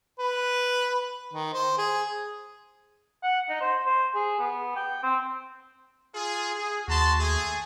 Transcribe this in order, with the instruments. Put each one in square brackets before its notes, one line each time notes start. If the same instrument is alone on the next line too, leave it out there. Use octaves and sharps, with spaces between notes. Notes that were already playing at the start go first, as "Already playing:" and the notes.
[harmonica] B4
D#3
C5
G#4
[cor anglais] F#5
D#4
C5
C5
G#4
B3
G5
C4
[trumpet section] F4 G#4
G#4
[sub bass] D#2 [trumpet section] F#4 A5 C6
[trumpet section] A3 G#4